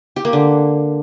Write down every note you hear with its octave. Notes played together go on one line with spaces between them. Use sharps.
G4
A#3
D3